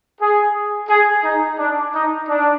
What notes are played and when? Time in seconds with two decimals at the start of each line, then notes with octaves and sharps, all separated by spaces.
0.20 G#4
0.89 G#4
1.24 D#4
1.59 D4
1.94 D#4
2.28 D4